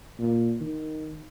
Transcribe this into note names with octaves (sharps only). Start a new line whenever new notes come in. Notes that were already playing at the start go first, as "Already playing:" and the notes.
A#2
D#3